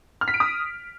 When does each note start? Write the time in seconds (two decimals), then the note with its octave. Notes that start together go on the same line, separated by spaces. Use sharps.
0.21 F6
0.28 B6
0.34 D7
0.40 D#6